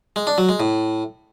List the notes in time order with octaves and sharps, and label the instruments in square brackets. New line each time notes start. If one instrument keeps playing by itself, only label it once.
[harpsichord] G#3
D4
F#3
G#3
A2